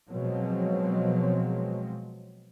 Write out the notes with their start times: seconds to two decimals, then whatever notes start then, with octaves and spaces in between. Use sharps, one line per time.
0.10 B2 F3 F#3 G#3 C4